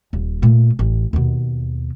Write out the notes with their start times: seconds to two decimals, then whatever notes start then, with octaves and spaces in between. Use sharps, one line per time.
0.13 D#1
0.42 A#2 A3
0.79 A1
1.13 D#2 B2